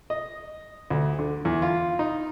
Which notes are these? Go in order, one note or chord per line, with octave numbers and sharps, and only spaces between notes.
D#5
D2
D3
E2
F4
D#4